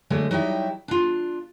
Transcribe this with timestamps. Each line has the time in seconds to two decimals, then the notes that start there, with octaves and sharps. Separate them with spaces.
0.10 D3 F#3 G#3 A3
0.31 F#3 G3 D#4 E4 G4 E5
0.88 D4 F4